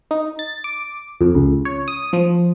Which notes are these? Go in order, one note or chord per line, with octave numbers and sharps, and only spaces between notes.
D#4
A6
D6
F2
C#2
C#5
D#6
F3